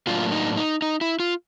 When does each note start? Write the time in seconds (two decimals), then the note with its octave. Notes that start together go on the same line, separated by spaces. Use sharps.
0.07 A2 F#3 A#3 D4 F4
0.32 D#4
0.57 D#4
0.82 D#4
1.01 E4
1.20 F4